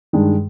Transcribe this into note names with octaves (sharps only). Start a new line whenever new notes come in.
G2 D#3 G#3